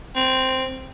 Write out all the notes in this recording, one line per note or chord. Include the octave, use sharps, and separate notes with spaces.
C4